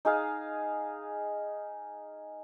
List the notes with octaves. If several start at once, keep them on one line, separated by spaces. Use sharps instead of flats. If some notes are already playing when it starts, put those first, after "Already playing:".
D#4 G#4 F5